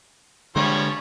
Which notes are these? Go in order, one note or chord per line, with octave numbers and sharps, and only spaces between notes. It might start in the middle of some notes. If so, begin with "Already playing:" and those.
D3 F3 G3 G#3 C#5